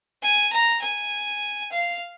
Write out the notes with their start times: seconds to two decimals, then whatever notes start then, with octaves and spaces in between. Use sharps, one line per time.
0.23 G#5
0.53 A#5
0.82 G#5
1.72 F5